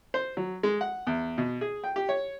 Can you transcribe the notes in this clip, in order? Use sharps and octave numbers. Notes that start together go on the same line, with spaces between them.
C5
F#3
G#3
F#5
E2
B2
G#4
G5
G4
C#5